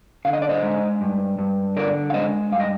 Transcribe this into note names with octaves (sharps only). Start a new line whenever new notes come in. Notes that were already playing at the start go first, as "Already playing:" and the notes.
D3 F5
D#5
D5
C5 D#5
G#3
G2
G2
D3 A#4 D5
F5
G#3 C5 D#5
G2 F5
D#5